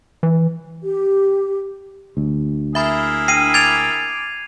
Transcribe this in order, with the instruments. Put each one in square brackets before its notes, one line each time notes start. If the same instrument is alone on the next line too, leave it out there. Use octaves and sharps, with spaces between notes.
[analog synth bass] E3
[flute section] G4
[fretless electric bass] D2
[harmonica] A#3 E4 G#4 [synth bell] E5 B5
[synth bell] D4 [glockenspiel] C7 D#7
[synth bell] D6 A6 D7 [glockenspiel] G#6 F7